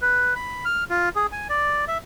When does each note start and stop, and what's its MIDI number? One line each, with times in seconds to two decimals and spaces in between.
0.02 0.34 71
0.36 0.65 83
0.65 0.84 89
0.90 1.09 65
1.16 1.27 68
1.32 1.48 80
1.49 1.85 74
1.88 1.98 76